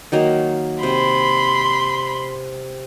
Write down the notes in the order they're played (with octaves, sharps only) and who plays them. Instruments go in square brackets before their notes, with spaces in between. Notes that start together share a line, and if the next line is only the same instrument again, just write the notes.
[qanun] D#3 F#3 A#3
[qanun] C3 [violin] B5 C6